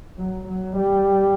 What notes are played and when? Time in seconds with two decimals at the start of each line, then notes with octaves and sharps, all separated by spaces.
0.18 F#3
0.48 F#3
0.77 G3